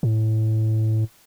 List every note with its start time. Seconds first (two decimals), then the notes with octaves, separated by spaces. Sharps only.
0.03 A2